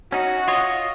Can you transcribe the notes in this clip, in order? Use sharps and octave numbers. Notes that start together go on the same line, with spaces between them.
C#4 D#4 F#4
F4 C#5 D#5